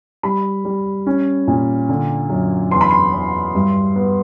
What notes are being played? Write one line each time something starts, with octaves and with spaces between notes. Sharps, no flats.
G3 B5
G3
C#4
A#2
D3
F#2
E2 C6
B5
C6
E2
G2
B3